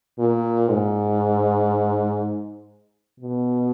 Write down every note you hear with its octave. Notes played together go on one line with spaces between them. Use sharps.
A#2
G#2
B2